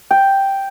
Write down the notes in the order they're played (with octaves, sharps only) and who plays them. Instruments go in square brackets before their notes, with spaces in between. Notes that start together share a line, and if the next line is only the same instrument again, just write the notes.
[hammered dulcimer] G5